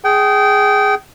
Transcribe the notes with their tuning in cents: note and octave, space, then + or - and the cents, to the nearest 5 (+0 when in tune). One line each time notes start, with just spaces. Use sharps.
G#4 +0 G5 -25